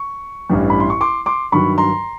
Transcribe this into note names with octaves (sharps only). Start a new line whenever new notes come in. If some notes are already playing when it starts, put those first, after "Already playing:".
Already playing: C#6
A1 G2 E3 G3
B5
C6
C#6
C6 D6
C6 D6
G2 D#3 F#3 B5 C#6
A#5 C6